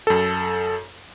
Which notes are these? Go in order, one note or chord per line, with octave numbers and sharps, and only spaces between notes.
F#2 A4